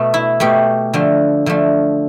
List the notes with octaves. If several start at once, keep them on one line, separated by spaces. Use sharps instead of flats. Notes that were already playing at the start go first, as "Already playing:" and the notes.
Already playing: B2 A3
E4
B2 A3 G4
D3 F3 A3
D3 F3 A3